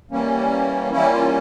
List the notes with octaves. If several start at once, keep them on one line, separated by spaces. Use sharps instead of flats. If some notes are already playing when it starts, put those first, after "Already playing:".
E3 G3 A#3 C#4
E3 G3 A#3 C#4 E4
F4